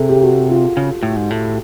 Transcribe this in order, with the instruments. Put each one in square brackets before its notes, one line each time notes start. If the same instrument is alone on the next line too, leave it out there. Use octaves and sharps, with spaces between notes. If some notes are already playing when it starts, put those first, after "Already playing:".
Already playing: [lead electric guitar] C3 [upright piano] G#4 A4
[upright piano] G4
F#4
F4
[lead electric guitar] C#3
A2
G#2
A2